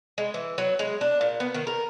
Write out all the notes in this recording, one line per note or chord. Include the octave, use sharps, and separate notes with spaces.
G#3
E3
F#3
G#3
D4
A#2
B3
D#3
A#4